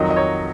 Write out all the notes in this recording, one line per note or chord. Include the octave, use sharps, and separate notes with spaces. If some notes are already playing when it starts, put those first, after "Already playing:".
Already playing: F2 D#3 F#3 D#5
D#5
C#5